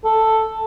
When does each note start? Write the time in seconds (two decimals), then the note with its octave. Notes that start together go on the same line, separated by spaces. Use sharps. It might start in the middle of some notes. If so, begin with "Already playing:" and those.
0.05 A4